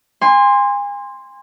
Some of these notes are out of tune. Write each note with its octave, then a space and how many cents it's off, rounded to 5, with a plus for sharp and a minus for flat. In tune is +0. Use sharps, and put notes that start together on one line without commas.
G#5 -35 C6 +0